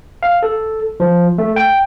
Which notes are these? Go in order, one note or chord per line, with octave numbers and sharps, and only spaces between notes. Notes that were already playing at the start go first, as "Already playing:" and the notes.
F5
A4
F3
A3
G5